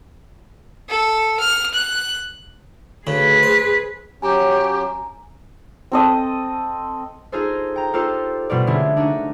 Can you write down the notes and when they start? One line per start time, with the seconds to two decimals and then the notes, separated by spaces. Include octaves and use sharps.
0.89 A4
1.39 F6
1.73 F#6
3.07 D2 C#3 G#4 B4
3.43 C5
4.22 F#3 C#4 G4 G#5 A#5
5.92 C4 A4 D#5
7.32 D#4 F4 G#4 A4 C5
7.76 G5 A#5
7.93 D#4 F4 G4 A4 C5
8.50 B2 G3 F4 D5
8.67 D3 G#3 A3 C#4 E4
8.97 D4 D#4 F#4